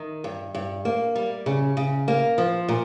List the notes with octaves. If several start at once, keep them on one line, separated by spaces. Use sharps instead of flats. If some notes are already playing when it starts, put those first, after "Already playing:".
Already playing: D#3
G2
G2
A#3
G3
C#3
C#3
A#3
F3
A#2